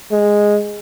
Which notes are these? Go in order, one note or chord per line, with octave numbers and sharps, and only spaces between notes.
G#3